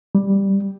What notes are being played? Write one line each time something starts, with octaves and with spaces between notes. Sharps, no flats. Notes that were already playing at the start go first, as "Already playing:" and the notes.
G3